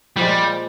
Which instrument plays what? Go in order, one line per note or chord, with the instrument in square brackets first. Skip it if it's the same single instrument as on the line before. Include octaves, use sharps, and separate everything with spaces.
[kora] A#2 F3 G#3 [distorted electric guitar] G3